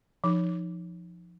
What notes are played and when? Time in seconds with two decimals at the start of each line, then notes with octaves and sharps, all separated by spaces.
0.24 F3 D#4